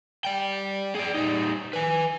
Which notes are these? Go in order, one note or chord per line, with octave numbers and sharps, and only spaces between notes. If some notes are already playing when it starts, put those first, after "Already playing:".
D5 G5
G#4 D5
G3 D#4
B4 G#5